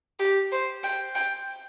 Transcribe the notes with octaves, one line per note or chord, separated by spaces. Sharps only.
G4
C5
G5
G5